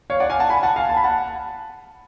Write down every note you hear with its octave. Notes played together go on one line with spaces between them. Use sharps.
C#5 F5
D5 F#5
F5 G#5
F#5 A5
G#5 B5
F#5 A5
F5 G#5
A5
B5
F#5 A5